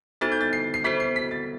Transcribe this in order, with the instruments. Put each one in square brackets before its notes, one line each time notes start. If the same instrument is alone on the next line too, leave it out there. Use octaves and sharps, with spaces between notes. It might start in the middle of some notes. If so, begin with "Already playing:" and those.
[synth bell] B3 D#4 F#4 A4 C5 [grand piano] A6
[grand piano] G6
A6
C7
C7
[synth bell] B3 F#4 A4 C5 [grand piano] B6
[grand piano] C7
B6
A6